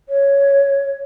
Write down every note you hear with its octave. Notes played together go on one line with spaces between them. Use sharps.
C#5